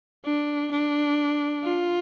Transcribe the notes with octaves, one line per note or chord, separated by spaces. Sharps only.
D4
D4
F4